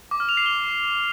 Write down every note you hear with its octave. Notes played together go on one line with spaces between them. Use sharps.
D6
F6
F7
C7
G7